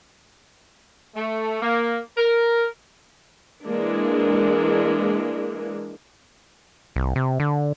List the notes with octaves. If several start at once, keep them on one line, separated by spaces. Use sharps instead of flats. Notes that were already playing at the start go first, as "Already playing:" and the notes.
A3
A#3
A#4
E3 G#3 A#3 D4
C2
C3
D3